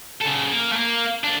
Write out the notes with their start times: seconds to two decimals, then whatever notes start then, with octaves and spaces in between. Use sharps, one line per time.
0.21 C#3 A4
0.51 A#3
0.72 A3 A#3
1.24 A3 D4